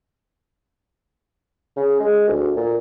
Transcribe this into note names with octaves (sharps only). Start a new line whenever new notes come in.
C#3
G#3
D2
A#2